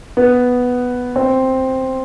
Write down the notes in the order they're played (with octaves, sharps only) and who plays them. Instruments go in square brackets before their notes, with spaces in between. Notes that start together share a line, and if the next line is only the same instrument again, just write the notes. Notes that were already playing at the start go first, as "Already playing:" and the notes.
[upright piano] B3
C4